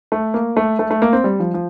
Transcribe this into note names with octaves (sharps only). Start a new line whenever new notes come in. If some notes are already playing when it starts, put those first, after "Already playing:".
A3
A#3
A3
A3
A3
A#3
C4
G3
F3
F3